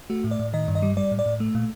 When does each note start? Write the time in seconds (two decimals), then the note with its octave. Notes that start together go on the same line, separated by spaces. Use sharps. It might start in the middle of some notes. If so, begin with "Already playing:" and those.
0.10 A3 F#4
0.24 A2
0.31 D5
0.39 A2
0.54 D#3 D#5
0.68 G2
0.75 D#5
0.82 G3
0.97 G3 D5
1.11 A2
1.19 D5
1.26 A2
1.40 A3
1.55 A#2